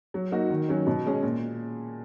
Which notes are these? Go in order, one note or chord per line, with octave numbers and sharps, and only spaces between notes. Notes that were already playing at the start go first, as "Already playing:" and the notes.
F#3
A#3 D#4 F#4
D#3
F#3 C#4
B2
G#3 C#4 G#4
A#2